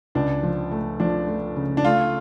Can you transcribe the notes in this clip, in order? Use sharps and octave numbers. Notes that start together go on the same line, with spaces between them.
C#2 D4
F3
A3
F3 D4
A3
C#3
D4
A3 F4